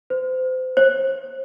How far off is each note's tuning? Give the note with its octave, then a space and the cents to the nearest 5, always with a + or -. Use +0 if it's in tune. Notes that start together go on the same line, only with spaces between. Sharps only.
C5 -30
C5 +40